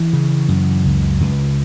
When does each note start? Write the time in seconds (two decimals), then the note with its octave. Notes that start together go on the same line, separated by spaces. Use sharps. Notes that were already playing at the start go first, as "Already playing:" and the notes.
Already playing: E3
0.13 C#3
0.48 F#2
0.85 C#2
1.20 C#2